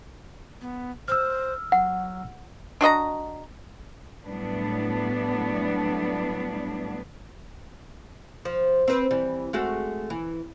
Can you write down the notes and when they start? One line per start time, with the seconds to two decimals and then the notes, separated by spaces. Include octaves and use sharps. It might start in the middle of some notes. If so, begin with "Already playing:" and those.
0.61 B3
1.08 C5 E6 F6
1.72 F#3 F#5
2.81 D4 F#4 D#5 A#5
4.25 A2 F#3 G3 B3 D4
8.45 F3
8.88 C4 B4
9.11 E3 G3
9.53 G#3 A3 F#4
10.10 E3